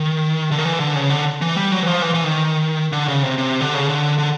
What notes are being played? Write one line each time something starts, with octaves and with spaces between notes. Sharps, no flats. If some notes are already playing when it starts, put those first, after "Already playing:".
Already playing: D#3
D3
D#3
E3
D3
C#3
D3
E3
G3
F#3
E3
F3
E3
E3
D#3
D3
C#3
C3
C3
D3
C#3
D3
D3